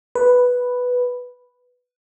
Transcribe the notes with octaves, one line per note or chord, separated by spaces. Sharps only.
B4